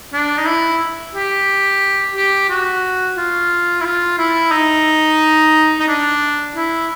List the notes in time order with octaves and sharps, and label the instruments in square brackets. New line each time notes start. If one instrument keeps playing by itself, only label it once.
[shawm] D4
D#4
E4
G4
G4
F#4
F4
E4
F4
E4
D#4
D#4
D4
E4